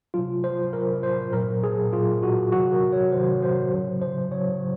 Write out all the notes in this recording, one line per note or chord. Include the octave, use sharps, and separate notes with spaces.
C3 F#3 F4
C5
C3 F#3 A#4
C5
A#2 F#3 A#4
G#4
A#2 F#3 F4
F#4
C3 D#3 F#3 F#4
A#4
C#5
C3 D#3 F#3 C5
C5
C#3 F#3
C5
C#3 F#3 C#5